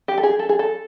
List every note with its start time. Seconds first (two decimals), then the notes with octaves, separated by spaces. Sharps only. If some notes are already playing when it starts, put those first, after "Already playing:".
0.08 G4
0.18 A4
0.23 G#4
0.39 A4
0.49 G#4
0.59 A4